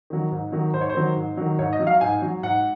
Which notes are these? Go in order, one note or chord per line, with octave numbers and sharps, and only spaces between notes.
D#3 F#3
G#2
D#3 F#3
G#2 C5
C#5
C5
D#3 F#3
G#2
D#3 F#3
G#2 C#5
D#5
F#3
F5
G#2 G#5
F#3
G#2 F#5